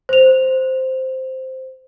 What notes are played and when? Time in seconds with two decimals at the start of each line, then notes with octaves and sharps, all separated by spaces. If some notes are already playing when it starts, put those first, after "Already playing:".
0.09 C5 F7